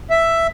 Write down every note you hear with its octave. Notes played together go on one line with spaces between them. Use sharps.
E5